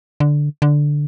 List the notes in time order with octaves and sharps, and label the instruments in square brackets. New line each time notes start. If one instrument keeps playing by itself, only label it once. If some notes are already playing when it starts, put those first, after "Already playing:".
[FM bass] D3
D3